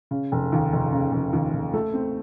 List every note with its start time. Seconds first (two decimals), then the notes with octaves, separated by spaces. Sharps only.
0.11 C#3
0.32 F1
0.52 D#2
0.73 F1
0.92 C#3
1.12 F1
1.33 D#2
1.53 F1
1.74 A3
1.94 C4